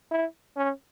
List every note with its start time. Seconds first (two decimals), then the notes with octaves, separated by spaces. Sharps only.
0.11 E4
0.57 C#4